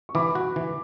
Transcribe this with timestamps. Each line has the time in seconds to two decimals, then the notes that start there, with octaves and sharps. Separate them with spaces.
0.09 C#6
0.15 E3 B5 D6
0.35 F#4
0.56 E3